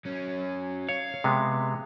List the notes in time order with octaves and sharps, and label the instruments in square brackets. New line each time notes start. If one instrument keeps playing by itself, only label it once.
[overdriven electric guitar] F#3 C#4
[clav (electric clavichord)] C#5 [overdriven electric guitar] F5
[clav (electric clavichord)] C3 G#3 B3